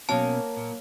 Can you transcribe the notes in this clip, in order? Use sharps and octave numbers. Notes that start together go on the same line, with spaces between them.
B2 F#3 A#3 C#4 F5 A5
A#2